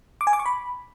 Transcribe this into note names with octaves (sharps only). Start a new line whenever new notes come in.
D6
G#5
D6
C#6
B5